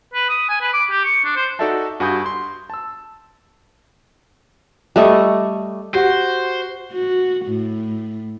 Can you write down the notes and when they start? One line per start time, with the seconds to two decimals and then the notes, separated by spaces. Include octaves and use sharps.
0.14 B4
0.29 D#6
0.49 G#5
0.61 B4
0.73 D6
0.91 G4
1.04 C#6
1.24 D4
1.36 C5
1.59 D#4 F#4 A4 D5 E5 A5
2.00 G2 F#4 G#5 B5 D#6 G6
2.26 C6
2.70 A5 E6
4.96 G3 A3 D#5 C#6
5.95 F#4 G4 C5 F#5
6.92 F#4
7.46 A2